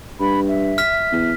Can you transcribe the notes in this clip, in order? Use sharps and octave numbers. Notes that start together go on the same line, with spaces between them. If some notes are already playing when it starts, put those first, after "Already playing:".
G2 B5
E5
F6 B6
E2